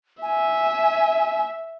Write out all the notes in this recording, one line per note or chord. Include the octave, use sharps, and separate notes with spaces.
E5 G#5